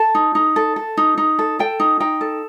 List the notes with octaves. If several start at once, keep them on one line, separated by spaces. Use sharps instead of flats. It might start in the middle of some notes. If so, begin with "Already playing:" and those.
Already playing: A4 A5
D#4
D#4
A4
A4
D#4
D#4
A4
A4 G5
D#4
D#4 G5
A4